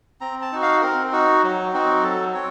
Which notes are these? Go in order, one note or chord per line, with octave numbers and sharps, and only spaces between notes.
C4 A#5
A5
D#4 F#4
F5
C4 A#4
D#4 F#4
F#3
C4 D#4 F#4
F#3 A4
C4 C#5